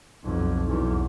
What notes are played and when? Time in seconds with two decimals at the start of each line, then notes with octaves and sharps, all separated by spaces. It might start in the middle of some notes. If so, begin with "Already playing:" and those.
0.23 B1 F2
0.66 B1 E2